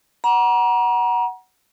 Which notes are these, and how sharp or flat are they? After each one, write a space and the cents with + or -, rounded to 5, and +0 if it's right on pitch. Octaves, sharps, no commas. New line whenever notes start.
F#5 +5 A#5 +35